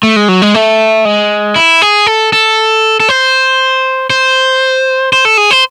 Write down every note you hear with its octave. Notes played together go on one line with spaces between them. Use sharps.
A3
G#3
F#3
G#3
A3
G#3
E4
G#4
A4
A4
A4
C5
C5
C5
A4
G#4
C5